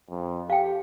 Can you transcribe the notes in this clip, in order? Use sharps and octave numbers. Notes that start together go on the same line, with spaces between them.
F2
G4 F5 G5